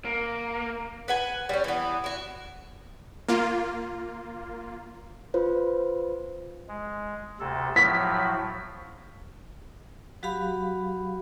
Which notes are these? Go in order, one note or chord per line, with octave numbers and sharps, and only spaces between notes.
A#3
B4 F#5 G#5
G3 C#4
E3 B3
E4 F#4
A#3 F4
F4 B4 C5
G#3
D2 C3 A4
A2 F3 F#3 B6
F#3 F#4 G4 F5 B5